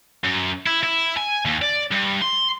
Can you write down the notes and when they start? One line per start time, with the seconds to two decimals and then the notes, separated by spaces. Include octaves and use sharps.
0.24 F#2
0.66 E4
0.83 E4
1.17 G#5
1.45 D#2
1.62 D5
1.92 G2
2.22 C6